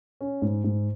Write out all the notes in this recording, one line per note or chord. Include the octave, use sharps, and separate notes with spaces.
C#4
G#2
G#2